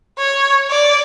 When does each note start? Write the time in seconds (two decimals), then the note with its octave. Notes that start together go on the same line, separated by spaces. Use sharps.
0.18 C#5
0.71 D5